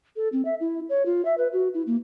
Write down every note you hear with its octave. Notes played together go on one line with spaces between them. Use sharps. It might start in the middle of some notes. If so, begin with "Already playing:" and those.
A4
C4
E5
E4
C#5
F4
E5
B4
F#4
E4
A#3